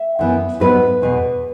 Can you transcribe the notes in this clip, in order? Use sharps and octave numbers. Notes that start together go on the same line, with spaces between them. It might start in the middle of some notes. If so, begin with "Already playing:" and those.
Already playing: E5
F#2 E3 B3
G#2 F#3 B3 B4
E2 B2 B3